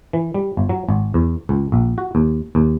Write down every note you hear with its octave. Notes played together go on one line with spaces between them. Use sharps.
E3
G3
G1
F#3
G#1
E2
C#2
A#1
F#4
D#2
D#2